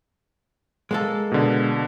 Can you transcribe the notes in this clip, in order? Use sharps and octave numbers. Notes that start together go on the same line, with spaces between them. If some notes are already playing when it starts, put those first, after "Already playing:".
G#3 A#3 A4
B2 D3